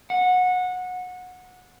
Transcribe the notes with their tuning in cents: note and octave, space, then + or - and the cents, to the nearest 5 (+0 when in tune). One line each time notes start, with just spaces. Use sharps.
F#5 -20